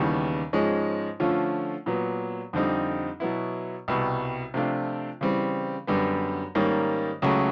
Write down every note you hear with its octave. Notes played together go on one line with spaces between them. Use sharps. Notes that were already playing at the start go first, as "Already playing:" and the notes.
Already playing: D#2 C#3 E3 G3 B3
G#2 F3 G#3 C#4
D3 F3 A3 C#4 F4
A#2 F#3 B3
F2 D3 G3 C4 D#4
B2 F#3 B3 E4
C2 B2 G3
C3 F3 A3 D4 F4
C#3 E3 G3 C4
F#2 D3 G3 B3
G#2 D#3 G3 A#3 C#4
C#2 C#3 F#3 A3